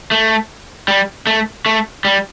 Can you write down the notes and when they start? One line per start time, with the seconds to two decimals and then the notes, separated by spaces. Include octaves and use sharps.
0.11 A3
0.88 G3
1.27 A3
1.66 A3
2.05 G3